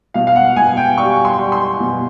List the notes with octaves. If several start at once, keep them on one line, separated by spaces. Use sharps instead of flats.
B2 F5
F5
F#5
B2 G#5
G5
G3 C#6
C6
G3
C6
B2